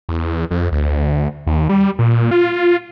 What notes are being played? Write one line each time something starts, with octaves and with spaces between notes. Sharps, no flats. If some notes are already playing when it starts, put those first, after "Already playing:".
E2
F2
D2
D#2
G3
A#2
F4